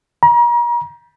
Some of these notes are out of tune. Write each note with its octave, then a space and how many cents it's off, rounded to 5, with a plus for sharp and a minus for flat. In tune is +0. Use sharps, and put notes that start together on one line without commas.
A#5 +40